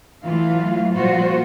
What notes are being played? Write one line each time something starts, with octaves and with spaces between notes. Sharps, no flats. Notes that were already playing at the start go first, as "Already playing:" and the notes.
E3 F#3 A3 F4 F5
A#2 F3 G3 F4 F#4 C5